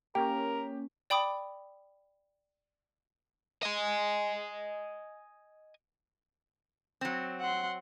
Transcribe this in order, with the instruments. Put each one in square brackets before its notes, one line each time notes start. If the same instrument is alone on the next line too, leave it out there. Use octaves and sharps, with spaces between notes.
[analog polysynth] A#3 C#4 [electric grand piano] G4 [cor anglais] A#4 [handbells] G5
[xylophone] D5 G5 B5 D6 D#6
[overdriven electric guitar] D#5 G#5
[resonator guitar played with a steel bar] F#3 C4
[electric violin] F#5 C6